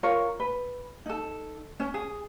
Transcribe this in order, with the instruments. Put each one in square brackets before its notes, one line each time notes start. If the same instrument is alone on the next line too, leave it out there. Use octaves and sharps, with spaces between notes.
[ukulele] F4 A#4 C#5
B4
D#4 A4
C#4
G#4